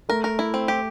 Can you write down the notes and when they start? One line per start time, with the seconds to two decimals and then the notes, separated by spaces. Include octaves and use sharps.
0.09 A3 A#4
0.24 A#4
0.39 E4
0.54 C4
0.68 G4